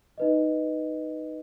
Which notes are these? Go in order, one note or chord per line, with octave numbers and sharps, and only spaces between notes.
D#4 B4 D#5